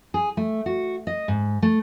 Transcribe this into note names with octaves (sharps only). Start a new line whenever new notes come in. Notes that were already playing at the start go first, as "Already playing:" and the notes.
G#4
A3
F#4
D#5
G#2
A3